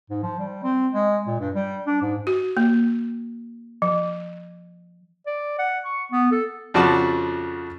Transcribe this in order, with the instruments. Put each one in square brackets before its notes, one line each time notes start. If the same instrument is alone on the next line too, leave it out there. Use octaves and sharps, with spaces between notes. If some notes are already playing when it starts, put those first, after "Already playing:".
[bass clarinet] G#2
F3
G3
C4
G#3
A#2
G2
G3
D4
G#2
[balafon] F#4
A#3
F3
[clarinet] D5
F#5
C#6
B3
A4
[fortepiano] F2 C#3 F3 F#4 D5 A5